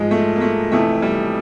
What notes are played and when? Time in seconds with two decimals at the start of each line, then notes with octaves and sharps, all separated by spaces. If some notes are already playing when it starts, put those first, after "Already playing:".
Already playing: G#2 F3 G#3
0.11 A3
0.36 A#3
0.41 A3
0.72 F2 C3 E3 A3
1.02 G3